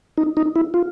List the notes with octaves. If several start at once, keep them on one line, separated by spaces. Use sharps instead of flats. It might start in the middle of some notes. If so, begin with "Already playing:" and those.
D#4
D#4
E4
F4